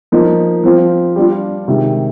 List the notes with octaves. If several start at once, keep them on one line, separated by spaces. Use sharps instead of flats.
F3 A#3 D#4
F3 C4 F4
G3 D4 F4
C3 D#3 G#3